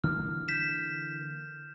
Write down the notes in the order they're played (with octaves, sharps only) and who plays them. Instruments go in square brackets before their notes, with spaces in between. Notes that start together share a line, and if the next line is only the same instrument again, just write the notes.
[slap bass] D3 E3 A#3 [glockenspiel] F6
[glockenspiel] G6 B6 E7